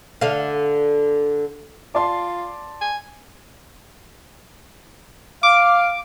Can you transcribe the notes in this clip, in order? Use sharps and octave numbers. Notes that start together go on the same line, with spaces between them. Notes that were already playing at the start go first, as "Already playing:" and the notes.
D3 F5
F4 D5 A5 C6
G#5
F5 D6